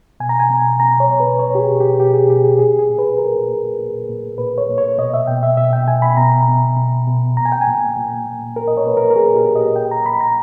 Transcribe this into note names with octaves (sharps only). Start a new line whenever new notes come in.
B2 G#5
A#5
G#5
B2
B2 A#5
C#5
B2
B4
B2 C#5
G4
G#4
B2
G4
B2 G4
G#4
B2 G4
G#4
A#2 G#4
G#4
A#2
B4
A#2 A#4
A#2
A#2
A#2
A#2 B4
C#5
A#2
C#5
B2 D#5
E5
B2 G5
E5
B2 E5
G5
B2 G#5
B5
B2 A#5
B2
B2
B2
A#2 A#5
G#5
G5
G#5
A#2
A#2
A#2
A#2 A#4
D#5
C#5
A#2 B4
A#4
A#4
A#2 G#4
G4
A#2
D#5
A#2 G5
A#5
A#2 B5
A#5